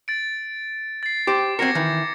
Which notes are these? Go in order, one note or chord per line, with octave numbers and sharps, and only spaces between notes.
A6 D7
A6 C7
G4 C5 D6 A6
C4 F#4 A#4 G#6 A#6 C#7
D#3 E3